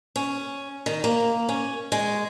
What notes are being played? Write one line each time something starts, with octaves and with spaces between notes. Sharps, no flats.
C#4
D#3
A#3
C#4
G#3